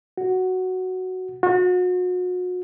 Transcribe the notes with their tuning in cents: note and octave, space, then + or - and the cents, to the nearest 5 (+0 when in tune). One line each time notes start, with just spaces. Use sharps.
F#4 +5
F#4 -35